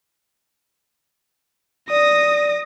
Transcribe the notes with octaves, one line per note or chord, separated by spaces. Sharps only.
D5 D#6 A#6